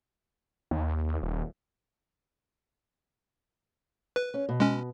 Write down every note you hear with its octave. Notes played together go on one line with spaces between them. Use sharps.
D#2
D#1
B4
C#4
B2
G#3 C#4